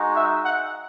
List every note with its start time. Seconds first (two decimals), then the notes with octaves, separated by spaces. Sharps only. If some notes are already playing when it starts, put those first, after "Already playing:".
Already playing: G#3 D#4 F#4
0.14 E5
0.43 F#5